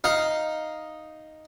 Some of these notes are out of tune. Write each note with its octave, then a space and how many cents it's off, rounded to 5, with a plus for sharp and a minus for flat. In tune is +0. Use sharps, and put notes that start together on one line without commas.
D#4 +0 F5 +0